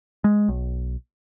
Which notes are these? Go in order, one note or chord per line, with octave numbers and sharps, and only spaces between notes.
G#3
B1